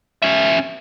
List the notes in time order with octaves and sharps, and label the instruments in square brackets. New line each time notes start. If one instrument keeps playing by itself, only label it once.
[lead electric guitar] C#4 E5